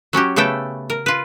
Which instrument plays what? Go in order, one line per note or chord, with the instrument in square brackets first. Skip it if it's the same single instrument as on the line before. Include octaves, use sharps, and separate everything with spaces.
[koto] F#3 C#4 F#4 G4
C#3 A3 B3 A4 G5
A#4
F4 B4